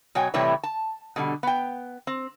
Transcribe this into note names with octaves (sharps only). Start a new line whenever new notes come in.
B2 F#3 C#5 G5 G#5
A2 C3 E3 G3 E4 C#5
A5
B2 D3 G3
B3 G5
C4